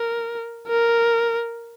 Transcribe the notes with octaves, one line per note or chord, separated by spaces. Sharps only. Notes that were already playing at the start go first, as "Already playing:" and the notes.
Already playing: A#4
A#4